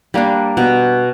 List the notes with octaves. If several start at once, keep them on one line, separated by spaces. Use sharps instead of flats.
G3 A#3 D4
B2